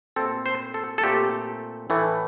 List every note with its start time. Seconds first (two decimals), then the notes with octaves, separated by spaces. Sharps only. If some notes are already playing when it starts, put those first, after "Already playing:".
0.16 A#2 A3 C4 A4
0.46 C5
0.74 A4
0.98 A4
1.03 A#2 A3 C4 G4
1.90 A2 E3 A3